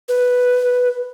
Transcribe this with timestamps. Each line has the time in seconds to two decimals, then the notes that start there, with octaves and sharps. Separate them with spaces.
0.09 B4